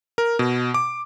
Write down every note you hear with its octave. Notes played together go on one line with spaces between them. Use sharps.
A#4
B2
D6